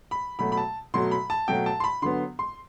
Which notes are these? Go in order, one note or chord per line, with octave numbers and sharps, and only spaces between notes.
B5
B2 F#3 A3 B5
B5
A5
B2 F#3 A3 C6
B5
A5
B2 F#3 A3 G5
A5
C6
B5
D3 F#3 B3 C6
C6